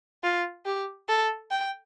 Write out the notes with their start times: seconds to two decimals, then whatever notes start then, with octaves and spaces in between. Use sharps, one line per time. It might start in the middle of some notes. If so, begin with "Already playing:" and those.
0.23 F4
0.66 G4
1.09 A4
1.51 G5